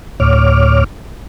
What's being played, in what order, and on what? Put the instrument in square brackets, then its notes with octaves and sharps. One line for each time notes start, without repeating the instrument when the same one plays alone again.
[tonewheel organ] D2 A2 C#5 D6 F6